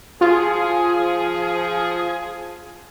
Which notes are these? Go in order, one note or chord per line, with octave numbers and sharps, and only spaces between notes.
F3 F4 G#4